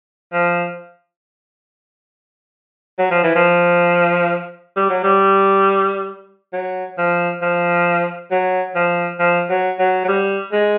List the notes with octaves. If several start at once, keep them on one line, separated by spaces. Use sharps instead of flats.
F3
F#3
F3
E3
F3
G3
F#3
G3
F#3
F3
F3
F#3
F3
F3
F#3
F#3
F#3
G3
G#3